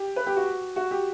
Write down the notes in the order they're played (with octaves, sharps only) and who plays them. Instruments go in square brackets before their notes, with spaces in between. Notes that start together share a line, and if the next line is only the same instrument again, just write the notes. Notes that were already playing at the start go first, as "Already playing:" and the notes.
Already playing: [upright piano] G4
B4
G4
F#4
F#4
G4